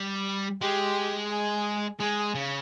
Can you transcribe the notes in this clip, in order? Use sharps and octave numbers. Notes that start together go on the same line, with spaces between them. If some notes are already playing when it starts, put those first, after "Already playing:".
Already playing: G3
G#3 G4
G#4
G#3 G#4
C#3